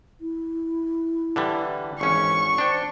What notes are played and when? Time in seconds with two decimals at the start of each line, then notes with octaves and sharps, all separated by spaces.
0.21 E4
1.36 D3 E3 G3
2.01 G#1 E3 C#4 C#6
2.58 D4 C5 G5